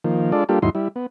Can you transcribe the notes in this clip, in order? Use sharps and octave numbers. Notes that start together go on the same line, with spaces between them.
D#3 F3 A#3
G#3 D4 F4 A4 D5
G3 A#3 D4 F4 G4 A4
D#2 G#2 F#3 D#4 E4 C6
G3 E4
B3